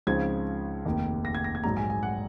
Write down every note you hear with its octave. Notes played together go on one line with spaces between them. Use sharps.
C#2 C#3 F3 C4 D#4 G#6
F1 D#2 D#3
A#6
G#6
A#6
G#6
A#1 G#2 F#3 A#5
G#5
G#5
F#5